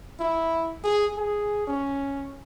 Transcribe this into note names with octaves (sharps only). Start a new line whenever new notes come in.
E4
G#4
G#4
C#4